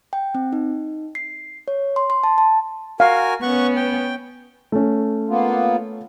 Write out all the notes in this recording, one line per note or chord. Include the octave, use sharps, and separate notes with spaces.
G5
C4
D#4
C7
C#5
C6
C6
A5
A5
F#4 A#4 F5 G#5
B3 C#4 F#5 C#6
G5
A3 C#4
A#3 B3 F4